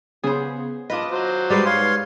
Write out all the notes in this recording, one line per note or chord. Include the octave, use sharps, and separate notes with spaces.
C#3 B3 G#4 C5
D4 F4 B4 D#5
F#3 C5
G#2 G3 G#3 B4 D5 C7
C#5 F5 C6